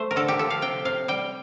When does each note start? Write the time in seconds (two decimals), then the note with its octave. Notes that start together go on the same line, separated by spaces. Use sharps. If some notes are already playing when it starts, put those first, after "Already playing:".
Already playing: A3 C5
0.11 A#4
0.16 D3 A4
0.28 G4
0.39 F3 A4
0.50 F5
0.62 C3 G5
0.85 C3 F5
1.08 G3 G5